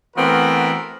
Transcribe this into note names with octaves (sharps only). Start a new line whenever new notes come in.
E3 A3 B3 C4 F#4 A#4